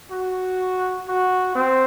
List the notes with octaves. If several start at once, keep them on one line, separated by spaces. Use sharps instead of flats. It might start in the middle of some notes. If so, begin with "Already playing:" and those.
F#4
F#4
C4